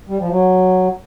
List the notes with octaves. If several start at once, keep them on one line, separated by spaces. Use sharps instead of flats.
G3
F3
F#3